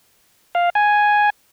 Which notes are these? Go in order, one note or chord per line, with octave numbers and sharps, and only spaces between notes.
F5
G#5